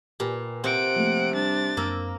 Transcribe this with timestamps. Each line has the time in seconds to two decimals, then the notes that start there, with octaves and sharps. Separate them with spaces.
0.20 A#2 G4 B4 G#5
0.64 C3 C4 F#5 D7
0.96 F3 A3 A#3
1.34 G3 D4 A6
1.77 F#2 A#3 E6 A#6